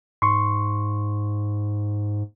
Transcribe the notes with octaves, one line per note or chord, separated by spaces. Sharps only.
G#2 C6 C#6